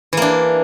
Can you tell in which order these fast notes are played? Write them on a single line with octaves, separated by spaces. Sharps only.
E3 A#3 D4